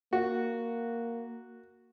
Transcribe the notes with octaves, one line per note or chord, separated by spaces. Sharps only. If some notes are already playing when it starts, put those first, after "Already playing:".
A#3 F#4